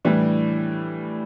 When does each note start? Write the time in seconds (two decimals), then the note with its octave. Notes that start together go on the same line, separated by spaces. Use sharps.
0.05 A2 E3 G3 D4